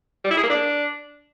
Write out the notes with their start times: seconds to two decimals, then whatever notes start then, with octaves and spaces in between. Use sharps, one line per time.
0.25 G3
0.31 E4
0.37 G#4
0.43 A#3
0.49 D4